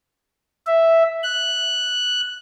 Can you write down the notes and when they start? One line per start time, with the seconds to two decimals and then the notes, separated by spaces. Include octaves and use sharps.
0.67 E5
1.23 F#6